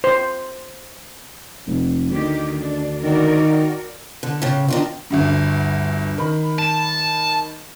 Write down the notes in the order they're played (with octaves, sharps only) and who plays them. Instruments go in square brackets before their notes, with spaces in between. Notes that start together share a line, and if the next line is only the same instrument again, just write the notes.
[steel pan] C5
[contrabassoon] F1
[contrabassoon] D2 [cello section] D#3 G4
[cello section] D4
[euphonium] D#3 [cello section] F#4 A#4 D5
[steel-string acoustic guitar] D3
A2 C#3
D#3 D4 F4
[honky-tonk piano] G1 D2 G2
D#3 B5
[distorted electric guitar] A5